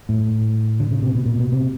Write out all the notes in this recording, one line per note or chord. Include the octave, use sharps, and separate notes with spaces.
A2
D3
C#3
C3
B2
A#2
B2
C3